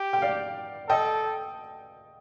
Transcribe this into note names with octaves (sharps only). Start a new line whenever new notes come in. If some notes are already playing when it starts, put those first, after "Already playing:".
Already playing: G4
G5
D5 F5
A4 D#5 G5